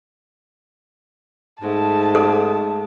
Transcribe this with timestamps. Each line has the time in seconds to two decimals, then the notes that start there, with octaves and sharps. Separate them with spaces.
1.62 G#2 G#3 A3 A5
2.15 A4